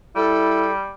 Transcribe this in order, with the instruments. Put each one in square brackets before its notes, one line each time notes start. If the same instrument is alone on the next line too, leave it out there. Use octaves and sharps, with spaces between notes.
[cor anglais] G3 [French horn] E4 [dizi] A4